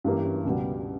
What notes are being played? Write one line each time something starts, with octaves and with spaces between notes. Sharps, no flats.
G2 E3 A#3 C#4 G4
C#2 B2 G3